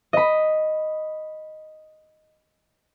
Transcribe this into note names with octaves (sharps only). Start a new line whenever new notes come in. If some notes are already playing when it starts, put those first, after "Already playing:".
D#5 B5